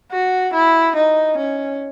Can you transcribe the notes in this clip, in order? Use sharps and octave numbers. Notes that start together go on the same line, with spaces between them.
F#4
E4
D#4
C#4